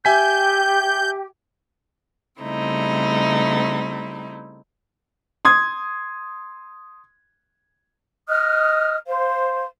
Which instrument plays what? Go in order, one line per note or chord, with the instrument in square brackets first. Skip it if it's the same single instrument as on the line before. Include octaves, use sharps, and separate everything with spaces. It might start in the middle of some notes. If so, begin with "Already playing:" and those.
[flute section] G4 [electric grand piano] E5 G#5 B6 [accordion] G6
[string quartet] C#3 G3 A3 C4 D#4 E4
[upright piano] C6 D#6 G#6
[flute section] D#5 D#6 F6 F#6
C5 F5